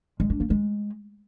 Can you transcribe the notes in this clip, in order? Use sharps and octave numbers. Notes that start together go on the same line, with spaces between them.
G#3
D4
A#3
G#3